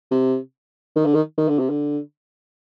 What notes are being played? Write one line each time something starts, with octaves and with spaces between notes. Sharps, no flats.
C3
D#3
D3
D#3
D#3
D3
C3
D3